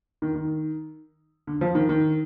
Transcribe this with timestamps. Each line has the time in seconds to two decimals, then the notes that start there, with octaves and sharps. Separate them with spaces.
0.22 D#3
0.36 D#3
1.47 D3
1.61 F3
1.75 D#3
1.89 D#3